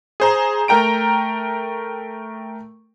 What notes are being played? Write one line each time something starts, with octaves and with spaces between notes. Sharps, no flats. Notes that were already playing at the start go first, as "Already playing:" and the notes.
G#4 C5 A#5
A3 A#4 G5 A#5 D7